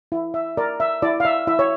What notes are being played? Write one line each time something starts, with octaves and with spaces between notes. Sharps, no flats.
E4
E5
A#4 D5
E5
E4 D5
F5
E5
E4 E5
C#5